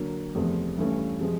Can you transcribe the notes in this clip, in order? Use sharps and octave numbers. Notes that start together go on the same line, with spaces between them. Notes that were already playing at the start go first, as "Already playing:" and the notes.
Already playing: D3 F#3 A#3
E2 C3 F3 A3
G2 E3 A3 C#4
C3 F3 G#3